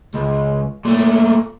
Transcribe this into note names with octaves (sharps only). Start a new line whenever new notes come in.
C#2
A#2 A3